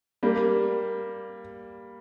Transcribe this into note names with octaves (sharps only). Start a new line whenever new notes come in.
G3 A#3